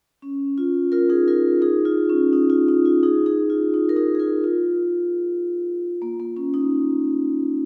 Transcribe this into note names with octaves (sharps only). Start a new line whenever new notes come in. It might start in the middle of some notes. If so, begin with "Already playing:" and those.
C#4
F4
F4 A#4
D#4 G#4
F4 A#4
D#4 G#4
F4
C#4
D#4
F4
D#4
F4
D#4 G#4
D#4 G#4
F4
D#4
A#4
D#4 G#4
G#4
F4 A#4
F4
A#3
A#3
C#4
D#4